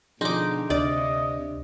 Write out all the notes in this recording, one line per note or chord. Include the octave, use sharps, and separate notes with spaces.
B2 D3 F3 D#4 G#4 C6 D6
D2 C3 D4 D5 D#5